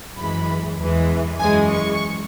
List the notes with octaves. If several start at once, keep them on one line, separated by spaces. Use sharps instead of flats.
F#2 E3 G#3 B5
E2 E3 G#3
F#2 E3 G#3 G#5
C#6